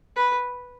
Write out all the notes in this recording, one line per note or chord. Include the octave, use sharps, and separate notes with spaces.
B4